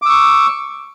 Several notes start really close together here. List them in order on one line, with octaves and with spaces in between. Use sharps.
D6 E6 C#6